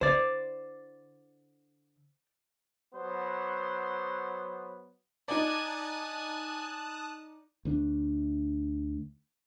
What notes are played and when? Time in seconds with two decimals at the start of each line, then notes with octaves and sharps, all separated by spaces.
0.01 D3 E4 C5 D5
2.94 F#3 B3 C5
5.28 D#4 D5 G#5 A5 D#6 F#6
7.65 D2 D3 D4